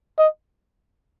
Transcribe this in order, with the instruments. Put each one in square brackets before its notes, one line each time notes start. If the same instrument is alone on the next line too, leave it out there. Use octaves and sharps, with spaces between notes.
[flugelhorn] D#5